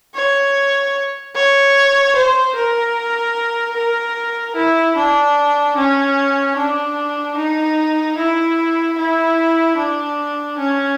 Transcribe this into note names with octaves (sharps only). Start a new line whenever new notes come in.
C#5
C#5
C5
A#4
A#4
E4
D4
C#4
D4
D#4
E4
E4
D4
C#4